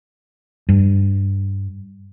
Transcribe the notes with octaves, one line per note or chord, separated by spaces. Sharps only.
G2